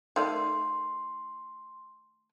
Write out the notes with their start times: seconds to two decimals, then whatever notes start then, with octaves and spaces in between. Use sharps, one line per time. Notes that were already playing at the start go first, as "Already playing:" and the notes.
0.16 D#3 A3 D5 C6